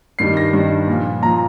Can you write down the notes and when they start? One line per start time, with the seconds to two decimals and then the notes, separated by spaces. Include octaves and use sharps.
0.19 G2 D#3 G3 C7
0.37 A#6
0.53 G2 D#3 G3
0.87 A#2 F3
1.22 A#2 F3 A#5